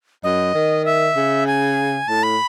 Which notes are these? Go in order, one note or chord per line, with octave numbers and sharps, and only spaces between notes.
F#2 D#5
D#3
E5
C#3
G#5
A2 A5
B5